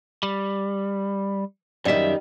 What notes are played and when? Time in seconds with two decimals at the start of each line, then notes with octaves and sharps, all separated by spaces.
0.23 G3
1.85 F#2 D#3 G3 E5